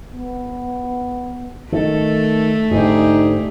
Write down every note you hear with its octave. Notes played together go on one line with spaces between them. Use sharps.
B3
D#3 A3 A4
G#2 D3 D#4 G4 G#4